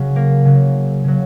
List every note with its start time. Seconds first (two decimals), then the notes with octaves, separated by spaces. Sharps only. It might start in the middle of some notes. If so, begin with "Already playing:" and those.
Already playing: C#3 F#3
0.16 A#3
0.45 C#3 F#3
1.04 C#3 F#3